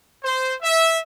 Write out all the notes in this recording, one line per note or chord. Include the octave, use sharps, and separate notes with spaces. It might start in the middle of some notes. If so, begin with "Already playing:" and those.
C5
E5